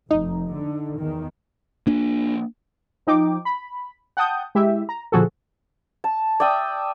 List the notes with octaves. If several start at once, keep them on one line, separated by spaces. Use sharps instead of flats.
F1 D#4
D3
E2 D#3
A#3 D4
F3 D#4 G5 D6
B5
F#5 G5 A5 D#6 G6
G#3 E4 G4 E5
A#5
A#2 D3 F3 F#4 G#4 A4
A5
D5 E5 G5 D#6